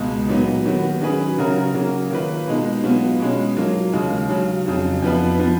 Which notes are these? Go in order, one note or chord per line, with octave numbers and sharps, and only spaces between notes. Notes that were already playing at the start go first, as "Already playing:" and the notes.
Already playing: C#2 B2 G#3
A#2 F#3 B3 D#4
D#3 F#3 B3 F#4
D#3 F#3 C#4 G#4 B4
C#3 F#3 C#4 F#4 A#4
C#3 F#3 A#3 C#4 F#4
D#3 A#3 F4 B4
B2 G#3 D#4
B2 F#3 B3 F4
B2 G#3 C#4
F#3 A#3 F4
D#2 C#3 G#3
C#3 F#3 C#4
F2 C#3 F#3
F2 F3 B3 F4 B4
F3 B3 F4